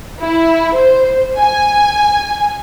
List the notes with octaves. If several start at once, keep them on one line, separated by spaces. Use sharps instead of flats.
E4
C5
G#5